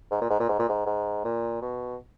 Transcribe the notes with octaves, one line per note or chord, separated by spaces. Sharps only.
G#2
A#2
G#2
A#2
G#2
A#2
G#2
G#2
A#2
B2